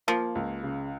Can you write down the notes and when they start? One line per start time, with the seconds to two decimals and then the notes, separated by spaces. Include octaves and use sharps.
0.08 F3 A#3
0.35 C#2
0.63 C#3